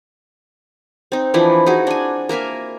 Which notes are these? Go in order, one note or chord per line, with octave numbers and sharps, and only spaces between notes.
C4 D#4
E3 F3 D4 E4
D#4 E4 F#4 G#4
D4 G#5
A#3 A#4 E5 G#5